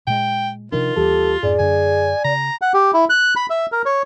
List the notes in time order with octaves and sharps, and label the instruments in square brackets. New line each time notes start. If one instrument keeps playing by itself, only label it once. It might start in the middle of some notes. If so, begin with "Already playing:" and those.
[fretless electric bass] A#2 G#3 [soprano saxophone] G5
[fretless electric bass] C3 F3 D4 [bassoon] D#3 [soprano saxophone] F4
[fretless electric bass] D#2 E3 G3 [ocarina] G4 [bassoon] A4
[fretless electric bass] F2 G#2 [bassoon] G#4 [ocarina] D5
[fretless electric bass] F#2 D3 [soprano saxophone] G#5
[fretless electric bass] C#3 [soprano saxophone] A#5
[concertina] F#5
G4
E4
F#6
B5
E5
A#4
C#5